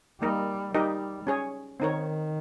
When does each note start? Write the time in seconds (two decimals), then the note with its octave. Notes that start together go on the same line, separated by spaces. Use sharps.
0.21 G3 A#3 D#4 A#4 D#5
0.74 G3 D#4 G4 A#4 D#5
1.27 C#4 G#4 C#5
1.80 D#3 C4 D#4 A#4 C#5